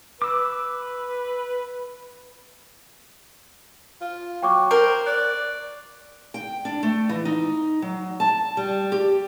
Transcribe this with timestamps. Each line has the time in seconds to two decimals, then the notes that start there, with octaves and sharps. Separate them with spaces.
0.22 B4 D6 E6
4.01 F4
4.43 F#3 G5 C#6 D6
4.71 A#4 C5
5.06 D5 F#6
6.34 G5
6.65 D4
6.83 A3
7.09 E3
7.25 D#4
7.82 F#3
8.20 A5
8.57 G3
8.92 G4